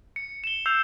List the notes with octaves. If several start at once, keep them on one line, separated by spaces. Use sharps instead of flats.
C#7
E7 G7
E6 G6 C7 F7